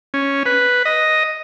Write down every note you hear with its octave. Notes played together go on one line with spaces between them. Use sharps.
C#4
B4
D#5